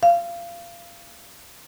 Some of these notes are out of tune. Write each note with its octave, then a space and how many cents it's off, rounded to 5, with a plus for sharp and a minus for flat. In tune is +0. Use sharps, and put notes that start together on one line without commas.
F5 -25